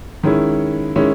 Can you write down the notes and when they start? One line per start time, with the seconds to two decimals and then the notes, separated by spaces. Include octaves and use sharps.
0.23 D#3 G#3 C#4 E4
0.96 D#3 G#3 C#4 E4